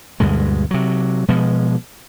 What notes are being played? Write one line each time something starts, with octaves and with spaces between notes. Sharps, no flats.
D2 G2 B2 G#3
C3 F#3
B2 F3 G#3